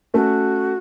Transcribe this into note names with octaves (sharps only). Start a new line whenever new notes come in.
A3 C#4 F#4